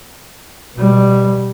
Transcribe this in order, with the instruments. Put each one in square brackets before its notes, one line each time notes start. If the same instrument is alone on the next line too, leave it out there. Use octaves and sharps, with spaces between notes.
[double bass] B2 G3